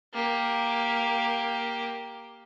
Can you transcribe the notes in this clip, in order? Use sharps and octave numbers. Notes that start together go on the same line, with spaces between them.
A#3 G4